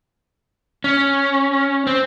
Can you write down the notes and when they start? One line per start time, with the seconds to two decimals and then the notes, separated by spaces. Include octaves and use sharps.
0.84 C#4
1.87 C4